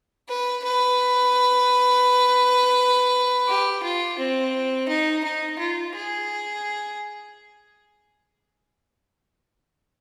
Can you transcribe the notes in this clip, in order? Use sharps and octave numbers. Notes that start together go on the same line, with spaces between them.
B4
B4
G4
F4
C4
D#4
D#4
F4
G#4